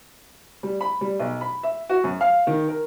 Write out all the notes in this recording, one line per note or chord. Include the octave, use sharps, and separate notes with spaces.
G3
B5
G3
B1
B5
E5
F#4
F#2
F5
D#3
A#4